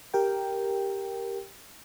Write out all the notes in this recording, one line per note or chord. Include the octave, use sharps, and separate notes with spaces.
G4 A#4 G5